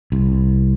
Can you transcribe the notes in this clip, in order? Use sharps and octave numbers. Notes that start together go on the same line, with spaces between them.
C2